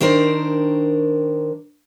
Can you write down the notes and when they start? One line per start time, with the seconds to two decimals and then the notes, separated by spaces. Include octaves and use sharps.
0.01 D#3 D4 A#4 C5